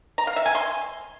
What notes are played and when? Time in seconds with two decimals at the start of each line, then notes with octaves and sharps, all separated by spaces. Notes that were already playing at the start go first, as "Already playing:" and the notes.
0.18 A#5
0.27 F5
0.36 E5
0.46 G#5
0.55 C6